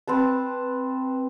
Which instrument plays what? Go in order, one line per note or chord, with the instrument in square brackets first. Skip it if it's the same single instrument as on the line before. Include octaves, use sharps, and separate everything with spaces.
[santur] C4 B4 A5